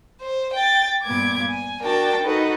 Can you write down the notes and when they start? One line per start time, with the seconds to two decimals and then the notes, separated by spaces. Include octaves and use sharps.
0.21 C5
0.54 G5 A6
1.03 G2 A#2 B3 D6 G#6
1.51 G#5
1.80 D4 F#4 A#4 G5 A5
2.22 D#4 F#4 A4 B4 F#5